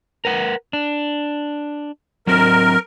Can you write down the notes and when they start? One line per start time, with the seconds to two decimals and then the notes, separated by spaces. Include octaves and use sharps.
0.25 A#4 B4 F#5
0.73 D4
2.27 F#3 C4 A#4